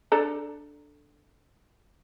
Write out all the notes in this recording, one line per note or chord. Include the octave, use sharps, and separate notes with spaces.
D4 A4 A#5